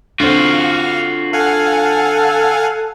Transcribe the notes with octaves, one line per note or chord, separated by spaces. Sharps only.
D3 C4 F4 F#4 F5
A4 F5 F#5 G#5